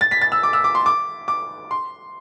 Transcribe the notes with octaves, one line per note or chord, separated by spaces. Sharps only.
A6
B6
A6
E6
D6
E6
D6
C6
D6
D6
C6